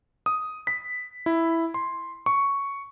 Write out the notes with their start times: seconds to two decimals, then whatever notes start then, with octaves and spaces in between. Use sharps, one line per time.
0.26 D#6
0.67 B6
1.26 E4
1.74 C6
2.26 C#6